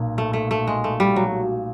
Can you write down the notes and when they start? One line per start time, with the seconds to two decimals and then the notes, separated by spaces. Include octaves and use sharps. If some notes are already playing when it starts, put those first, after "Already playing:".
Already playing: B1 A#2
0.18 A3
0.33 A3
0.51 A3
0.67 G#3
0.84 A3
1.00 G3
1.16 F#3